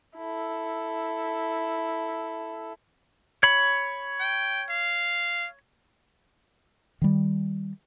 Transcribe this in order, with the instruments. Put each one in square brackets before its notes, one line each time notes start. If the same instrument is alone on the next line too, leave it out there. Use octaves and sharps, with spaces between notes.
[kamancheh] E4 A4
[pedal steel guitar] C#5 B5
[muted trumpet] G5
F5
[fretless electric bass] D#3 G3